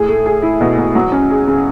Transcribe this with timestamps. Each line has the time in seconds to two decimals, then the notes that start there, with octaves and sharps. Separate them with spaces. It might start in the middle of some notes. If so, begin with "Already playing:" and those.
Already playing: A2 G#4
0.08 A3
0.26 G#4
0.42 E4
0.61 B2
0.78 B2
0.95 F#3
1.12 C#4
1.30 G#4
1.47 C#3